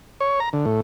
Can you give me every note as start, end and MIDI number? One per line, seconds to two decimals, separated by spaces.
0.21 0.40 73
0.40 0.49 82
0.53 0.65 50
0.65 0.80 45